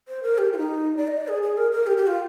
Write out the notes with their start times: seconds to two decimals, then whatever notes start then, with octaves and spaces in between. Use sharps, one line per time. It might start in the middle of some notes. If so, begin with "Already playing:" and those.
0.08 C5
0.23 A#4
0.38 G4
0.53 F4
0.58 D#4
0.97 D5
1.07 D#5
1.17 D5
1.28 G#4
1.42 G#4
1.57 A#4
1.72 A#4
1.87 G4
1.97 G4
2.07 F4